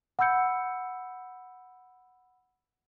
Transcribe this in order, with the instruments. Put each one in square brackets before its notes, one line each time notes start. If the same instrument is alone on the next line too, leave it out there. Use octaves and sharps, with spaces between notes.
[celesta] F#5 B5 E6 G6 C#7